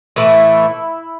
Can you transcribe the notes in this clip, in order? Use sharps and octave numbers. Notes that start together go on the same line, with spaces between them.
A2 E3 A3 E4